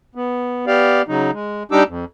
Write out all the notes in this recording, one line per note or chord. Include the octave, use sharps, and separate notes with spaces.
B3
B3 G4 D5 F5
C#3 F#3 D#4
G#3
G3 D4 D#4 G4 D6 E6
F2